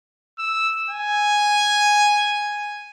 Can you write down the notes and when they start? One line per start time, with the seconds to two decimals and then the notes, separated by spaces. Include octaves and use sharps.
0.39 E6
0.90 G#5